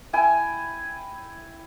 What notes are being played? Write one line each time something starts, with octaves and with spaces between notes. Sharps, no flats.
E4 G5 G#5